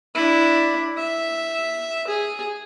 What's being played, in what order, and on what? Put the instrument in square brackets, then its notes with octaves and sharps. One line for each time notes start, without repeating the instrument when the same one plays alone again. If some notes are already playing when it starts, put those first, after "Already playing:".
[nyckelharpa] D4 E4
E5
G#4